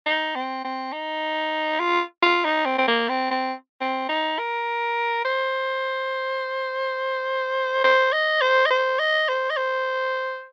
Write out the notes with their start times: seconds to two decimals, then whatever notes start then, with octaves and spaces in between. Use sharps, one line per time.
0.06 D#4
0.36 C4
0.65 C4
0.93 D#4
1.80 F4
2.23 F4
2.45 D#4
2.65 C4
2.78 C4
2.88 A#3
3.09 C4
3.31 C4
3.81 C4
4.09 D#4
4.39 A#4
5.25 C5
7.84 C5
8.13 D#5
8.41 C5
8.66 D#5
8.71 C5
8.99 D#5
9.28 C5
9.50 D#5
9.57 C5